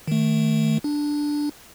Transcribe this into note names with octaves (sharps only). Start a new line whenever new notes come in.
D#3 A3
D4